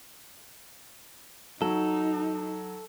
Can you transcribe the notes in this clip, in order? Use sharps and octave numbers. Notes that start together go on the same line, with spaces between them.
F#3 D#4 A4